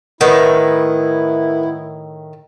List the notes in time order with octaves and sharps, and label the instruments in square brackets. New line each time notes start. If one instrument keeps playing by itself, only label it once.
[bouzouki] A2 D#3 [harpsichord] B3 [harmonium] E4 [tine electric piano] A#4